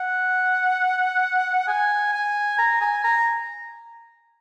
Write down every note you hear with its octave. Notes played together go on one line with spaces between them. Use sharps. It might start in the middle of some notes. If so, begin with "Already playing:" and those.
Already playing: F#5
G#5
G#5
A#5
G#5
A#5